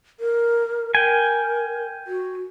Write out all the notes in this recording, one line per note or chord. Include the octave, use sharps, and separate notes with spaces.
A#4
A#4 G5 G#5
F#4